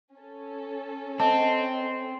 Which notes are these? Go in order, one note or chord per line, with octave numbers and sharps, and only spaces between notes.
C#4 A4
C4 D#5 A5